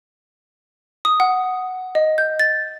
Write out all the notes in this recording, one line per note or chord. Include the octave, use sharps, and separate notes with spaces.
D#6
F#5
D#5
G6
A6